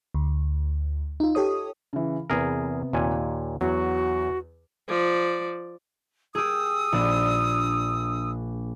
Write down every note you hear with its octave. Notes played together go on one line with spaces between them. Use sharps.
D2
D#4 F4
G4 A4 C#5 D#6
C#3 E3
E2 C3 B3 G#4 A#4
D#2 A#2 G#5
E2 F#3 F#4
F3 D5
G4 G#4 D#6 E6
A#1 D4